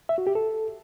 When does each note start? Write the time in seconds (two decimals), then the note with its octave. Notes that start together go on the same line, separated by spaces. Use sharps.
0.09 E5
0.18 F#4
0.27 G4
0.35 A4